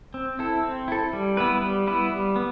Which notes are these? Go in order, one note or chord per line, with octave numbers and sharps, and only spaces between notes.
C4
E4 A4
C4
E4 A4
G3
B3 E4 B4
G3
B3 E4 B4
G3
B3